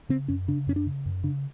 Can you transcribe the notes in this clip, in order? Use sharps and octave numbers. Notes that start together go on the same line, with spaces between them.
C#3 C4
F#2 C#4
C#3 D4
F#2 C#4
D4
C#3
F#2
C#3 D4